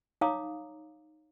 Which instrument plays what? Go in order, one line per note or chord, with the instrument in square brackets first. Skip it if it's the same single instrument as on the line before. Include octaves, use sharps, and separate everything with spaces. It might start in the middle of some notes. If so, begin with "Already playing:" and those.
[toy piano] D#4 C#5 F5 A#5 D6 D#6